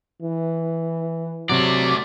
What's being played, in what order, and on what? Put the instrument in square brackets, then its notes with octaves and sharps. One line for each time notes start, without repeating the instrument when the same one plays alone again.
[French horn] E3
[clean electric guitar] C3 F#3 [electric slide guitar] A3 D5